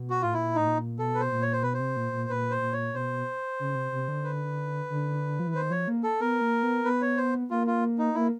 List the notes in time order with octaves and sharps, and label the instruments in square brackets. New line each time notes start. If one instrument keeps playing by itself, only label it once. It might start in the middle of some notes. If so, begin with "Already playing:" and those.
Already playing: [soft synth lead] B2
[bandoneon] F#4
[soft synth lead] A2 [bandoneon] F4
[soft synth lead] A#2 [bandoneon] E4
[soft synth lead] A2 [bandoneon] D#4
[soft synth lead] A#2
[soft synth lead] B2 [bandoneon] A4
[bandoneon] B4
C5
[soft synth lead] A#2
[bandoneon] C#5
C5
[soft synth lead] B2 [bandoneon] B4
[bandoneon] C5
[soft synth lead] C3
A#2
A#2
[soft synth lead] A#2 [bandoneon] B4
[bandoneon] C5
[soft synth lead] A#2
[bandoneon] C#5
[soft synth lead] B2 [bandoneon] C5
[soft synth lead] C#3
C3
C3
D3
[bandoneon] B4
[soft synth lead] D3
F3
E3
[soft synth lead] D#3 [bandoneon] C5
[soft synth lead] F3 [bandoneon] C#5
[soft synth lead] A#3
[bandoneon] A4
[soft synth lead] B3 [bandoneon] A#4
[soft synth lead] A#3
B3
[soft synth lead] B3 [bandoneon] B4
[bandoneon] C#5
C5
[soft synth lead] A#3 [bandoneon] F4
[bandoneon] F4
D#4
[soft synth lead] A#3 [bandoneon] E4